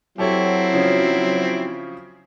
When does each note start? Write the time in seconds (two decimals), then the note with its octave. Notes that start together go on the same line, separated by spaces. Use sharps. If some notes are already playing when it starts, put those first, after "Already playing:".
0.18 F#3 C4 E4 G4 A4 C#5
0.73 C#3 F3 C#4